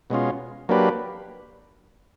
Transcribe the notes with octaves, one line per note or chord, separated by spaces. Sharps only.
B2 G#3 C#4 F4
F#3 A#3 D4 G4 B4